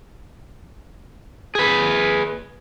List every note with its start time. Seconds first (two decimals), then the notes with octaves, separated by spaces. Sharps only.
1.55 G#4 B4